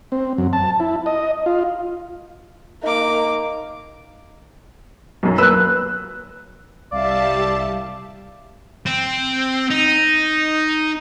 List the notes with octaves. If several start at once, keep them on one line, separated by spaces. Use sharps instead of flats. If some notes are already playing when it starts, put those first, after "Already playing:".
C4
F#2
A5
E4
D#5
F4
A#3 D#4 D6
B1 F#2
A#3 B4 E6 F#6
C2 G3 D5 E5 F5 A5
C4
D#4